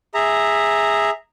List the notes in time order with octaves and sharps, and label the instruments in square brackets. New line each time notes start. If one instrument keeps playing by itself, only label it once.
[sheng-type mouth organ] G#4 E5 A#5